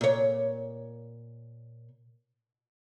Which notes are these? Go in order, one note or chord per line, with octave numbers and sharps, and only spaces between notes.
A#2 C#5